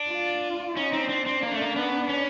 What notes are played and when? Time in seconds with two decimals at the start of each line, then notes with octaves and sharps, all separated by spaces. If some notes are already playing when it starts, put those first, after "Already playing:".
Already playing: D4
0.10 F4
0.77 C#4 D#4
0.93 C4
1.09 C4 D4
1.26 C4
1.43 A#3
1.52 A3
1.61 A#3
1.76 B3
2.09 C#4